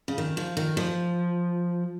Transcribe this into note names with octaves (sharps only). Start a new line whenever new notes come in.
C#3
D#3
F3
D#3
F3